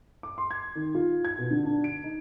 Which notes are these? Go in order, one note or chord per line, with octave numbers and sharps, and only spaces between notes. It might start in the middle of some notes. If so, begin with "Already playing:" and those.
D6
C6
G#6
D#3
F4
G#6
B2
D3
D4
D7
D#4